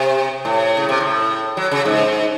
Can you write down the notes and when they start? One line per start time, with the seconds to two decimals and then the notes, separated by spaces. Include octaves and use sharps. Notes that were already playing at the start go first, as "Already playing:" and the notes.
Already playing: C3
0.45 A2
0.77 C#3
0.89 C3
1.00 A2
1.57 F#3
1.71 C#3
1.85 G#2